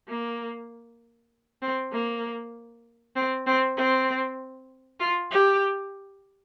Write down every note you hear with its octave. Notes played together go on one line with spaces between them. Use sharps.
A#3
C4
A#3
C4
C4
C4
F4
G4